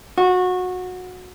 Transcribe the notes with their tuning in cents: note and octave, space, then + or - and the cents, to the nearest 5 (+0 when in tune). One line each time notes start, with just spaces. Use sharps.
F#4 -20